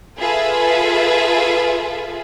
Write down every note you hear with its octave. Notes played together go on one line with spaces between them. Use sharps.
F4 G#4 A4 B4 E5